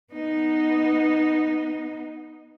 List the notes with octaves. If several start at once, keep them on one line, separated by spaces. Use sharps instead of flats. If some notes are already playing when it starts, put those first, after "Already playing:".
B3 D#4